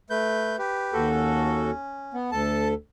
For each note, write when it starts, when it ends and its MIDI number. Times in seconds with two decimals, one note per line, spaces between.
0.10 0.56 57
0.10 0.56 71
0.10 0.56 91
0.59 1.09 67
0.59 1.09 71
0.93 1.71 39
0.93 1.71 66
0.93 1.71 69
1.10 2.16 61
2.14 2.30 59
2.32 2.74 38
2.32 2.74 69
2.32 2.68 81